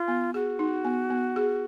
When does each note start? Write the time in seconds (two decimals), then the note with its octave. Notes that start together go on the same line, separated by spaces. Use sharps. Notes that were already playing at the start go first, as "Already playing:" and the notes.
Already playing: F4
0.08 B3
0.34 F#4 G#4
0.59 D#4
0.85 B3
1.10 B3
1.36 G#4